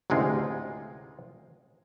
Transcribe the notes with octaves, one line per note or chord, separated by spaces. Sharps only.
A1 D2 C3 G#3 F4